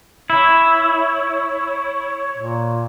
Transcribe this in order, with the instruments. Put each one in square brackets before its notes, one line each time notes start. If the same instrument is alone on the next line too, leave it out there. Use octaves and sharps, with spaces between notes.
[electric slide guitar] E4 [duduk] C#5
[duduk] A#2